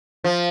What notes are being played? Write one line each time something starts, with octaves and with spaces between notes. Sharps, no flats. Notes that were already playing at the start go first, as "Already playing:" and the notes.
F3